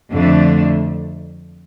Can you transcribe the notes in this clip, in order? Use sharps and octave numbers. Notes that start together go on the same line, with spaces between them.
F2 D3 A3 D4